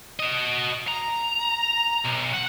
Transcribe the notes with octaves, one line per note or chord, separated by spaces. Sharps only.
F#4 D#5
A#5
B1
F#5